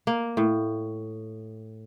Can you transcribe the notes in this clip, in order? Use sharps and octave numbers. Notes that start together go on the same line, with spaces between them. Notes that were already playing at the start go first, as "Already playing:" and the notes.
A#3
A2